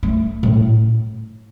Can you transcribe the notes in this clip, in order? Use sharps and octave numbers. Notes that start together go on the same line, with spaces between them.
A3
A2